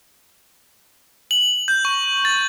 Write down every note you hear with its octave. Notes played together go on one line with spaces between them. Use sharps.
F#7
G6
C#6
A6